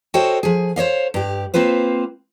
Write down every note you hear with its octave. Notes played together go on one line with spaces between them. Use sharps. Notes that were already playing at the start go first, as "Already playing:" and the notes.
F#4 A4 C5 C#5 D#5 G5
F3 G#4
C5 C#5 D#5 F5
G2 G4
A#3 C4 F4 B4 C5